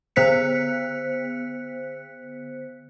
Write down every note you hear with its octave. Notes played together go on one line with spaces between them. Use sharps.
D3 B3 C5 F#6 B6 C#7